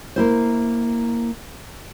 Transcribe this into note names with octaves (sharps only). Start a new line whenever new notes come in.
A#3 E4 C5